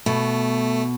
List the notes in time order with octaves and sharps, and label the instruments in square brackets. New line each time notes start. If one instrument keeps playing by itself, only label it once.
[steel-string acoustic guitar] B2 [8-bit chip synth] A3